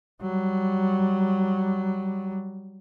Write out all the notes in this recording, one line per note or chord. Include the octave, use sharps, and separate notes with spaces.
F#3 G3